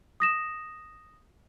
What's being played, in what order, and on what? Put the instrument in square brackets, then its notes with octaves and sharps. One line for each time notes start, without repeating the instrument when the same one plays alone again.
[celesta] D#6 A#6 E7